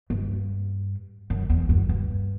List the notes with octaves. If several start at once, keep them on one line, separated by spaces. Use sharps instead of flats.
G2
F#2
E2
F#2
G2